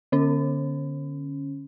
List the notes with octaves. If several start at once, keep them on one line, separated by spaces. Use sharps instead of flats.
D3 C#4